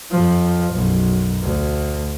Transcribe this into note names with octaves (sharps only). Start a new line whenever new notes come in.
F2 F3
B1 F#2
D2